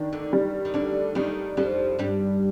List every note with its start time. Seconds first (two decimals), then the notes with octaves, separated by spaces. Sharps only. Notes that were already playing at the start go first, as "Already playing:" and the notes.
Already playing: D#3 D4
0.13 D2 D3
0.33 G3
0.65 D#3
0.74 D2 D3 D4
1.15 D#2 D#3 G3
1.57 F2 F3 G3
1.99 G2 G3 D4